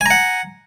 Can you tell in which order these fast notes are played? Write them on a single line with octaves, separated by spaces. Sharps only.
G#5 A#5 F#5